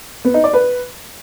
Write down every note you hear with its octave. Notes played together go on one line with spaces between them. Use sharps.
B3
D#4
D5
B4